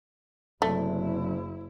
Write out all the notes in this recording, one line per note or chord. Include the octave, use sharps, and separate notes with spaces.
F#1 F#2 C3 A3 D4 E4